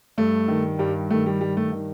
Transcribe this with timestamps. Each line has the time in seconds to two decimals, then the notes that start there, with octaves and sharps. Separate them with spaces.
0.18 G2 A3
0.48 D#3
0.79 G2 G3
1.10 D#3 A3
1.26 G3
1.41 G2 G3
1.57 A3
1.72 D#3